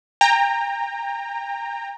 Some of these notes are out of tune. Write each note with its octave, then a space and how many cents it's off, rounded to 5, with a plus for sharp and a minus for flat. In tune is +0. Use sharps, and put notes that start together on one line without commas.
G5 +35 A#5 -10